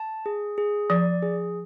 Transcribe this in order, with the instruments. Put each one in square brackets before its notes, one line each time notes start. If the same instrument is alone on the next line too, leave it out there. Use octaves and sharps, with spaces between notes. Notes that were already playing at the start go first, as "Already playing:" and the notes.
Already playing: [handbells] A5
G#4
G#4
[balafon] F3 [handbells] D5
[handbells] G#4